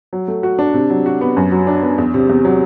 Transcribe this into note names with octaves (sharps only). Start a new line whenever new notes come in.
F#3
A3
F#4
D4
C3
F#3
F#4
B3
F#2
F#3
D4
B3
E2
C3
E2
F#3